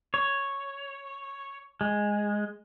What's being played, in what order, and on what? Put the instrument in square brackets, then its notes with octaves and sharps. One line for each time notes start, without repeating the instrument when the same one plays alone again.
[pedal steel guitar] C#5
G#3